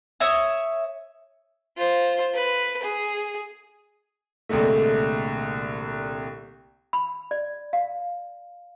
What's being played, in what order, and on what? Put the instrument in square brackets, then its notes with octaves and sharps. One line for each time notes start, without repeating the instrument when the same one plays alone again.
[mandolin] C#5 E5 D#6
[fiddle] F4 C5
B4
G#4
[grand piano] C2 A#2 D3 G#3 A3
[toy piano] B5
D5
F5